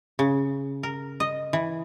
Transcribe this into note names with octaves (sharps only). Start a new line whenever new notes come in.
C#3
A#4
D#5
E3